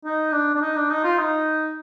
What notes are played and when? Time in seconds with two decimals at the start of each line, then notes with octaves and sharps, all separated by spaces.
0.05 D#4
0.32 D4
0.55 D4
0.61 D#4
0.76 D4
0.90 D#4
1.04 F4
1.18 D#4